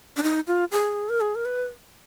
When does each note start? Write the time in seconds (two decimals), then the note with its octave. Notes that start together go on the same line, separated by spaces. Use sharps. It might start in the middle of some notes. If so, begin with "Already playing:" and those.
0.17 D4
0.23 D#4
0.47 F4
0.72 G#4
1.09 A#4
1.21 G#4
1.35 A#4
1.45 B4